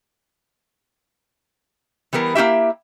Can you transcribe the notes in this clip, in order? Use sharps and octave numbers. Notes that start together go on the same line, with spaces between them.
E3 G3 B3 A#4
A#3 D#4 E4 G4 E5